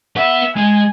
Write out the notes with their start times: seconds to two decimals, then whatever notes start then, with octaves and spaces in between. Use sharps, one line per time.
0.16 B4 E5 F#5
0.56 G#3 G#5